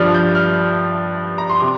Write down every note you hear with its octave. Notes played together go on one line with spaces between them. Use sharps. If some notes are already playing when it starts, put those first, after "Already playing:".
Already playing: G2 F3 D4 F6
G6
F6
A#5
C6
C3 D6